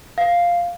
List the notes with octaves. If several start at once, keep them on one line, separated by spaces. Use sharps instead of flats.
F5